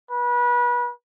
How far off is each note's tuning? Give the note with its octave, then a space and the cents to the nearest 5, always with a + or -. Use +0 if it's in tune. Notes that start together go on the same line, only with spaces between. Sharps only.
B4 -30